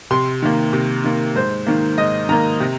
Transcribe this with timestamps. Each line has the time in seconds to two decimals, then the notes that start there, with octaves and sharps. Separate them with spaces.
0.11 C3 C6
0.42 D#3 A#3
0.73 C3
1.04 D#3 A#3
1.36 G#2 C5
1.67 D#3 A#3
1.98 G#2 D#5
2.29 D#3 A#3 A#5
2.60 C3